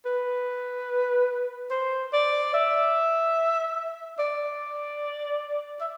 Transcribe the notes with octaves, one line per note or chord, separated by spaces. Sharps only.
B4
C5
D5
E5
D5
E5